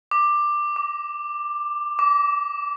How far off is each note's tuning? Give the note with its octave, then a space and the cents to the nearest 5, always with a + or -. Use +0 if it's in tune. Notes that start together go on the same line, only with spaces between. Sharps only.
D6 +10
D6 -15
D6 -20